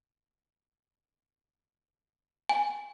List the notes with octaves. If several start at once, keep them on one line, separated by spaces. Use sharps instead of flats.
G#5